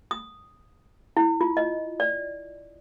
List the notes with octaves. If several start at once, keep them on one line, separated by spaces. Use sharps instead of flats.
D#6
E4
F4
D#5
D5